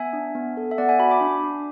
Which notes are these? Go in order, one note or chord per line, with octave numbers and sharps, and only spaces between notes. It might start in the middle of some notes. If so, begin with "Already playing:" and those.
Already playing: B3 E5 G#5
D4
B3
A4
E5
B3 D5 F#5
E5 G#5
F#4 G#5 B5
B5 D6
D4
D4